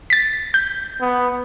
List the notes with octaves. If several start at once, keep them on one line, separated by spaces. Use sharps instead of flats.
A6 B6
G6
B3